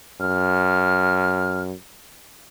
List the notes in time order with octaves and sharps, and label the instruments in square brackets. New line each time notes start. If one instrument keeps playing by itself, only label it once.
[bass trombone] F#2 [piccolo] F6